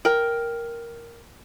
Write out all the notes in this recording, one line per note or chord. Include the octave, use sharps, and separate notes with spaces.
A#4 G5